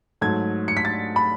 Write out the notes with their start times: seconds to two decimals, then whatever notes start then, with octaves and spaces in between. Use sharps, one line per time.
0.21 G#2 F#3 A3 G#6
0.68 C#7
0.77 B6
0.85 A6
1.16 B5